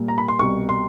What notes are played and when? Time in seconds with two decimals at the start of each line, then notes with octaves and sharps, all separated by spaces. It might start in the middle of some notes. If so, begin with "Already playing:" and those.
Already playing: A#2 G3 A#3
0.08 A#5
0.18 B5
0.28 C6
0.39 C2 B2 G3 C#6
0.69 C6